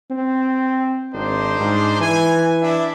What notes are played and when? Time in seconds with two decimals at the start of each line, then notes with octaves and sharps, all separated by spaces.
0.10 C4
1.13 G#1 D4 D#4 C5
1.60 G#2
2.01 E3 G#5
2.61 D4 E4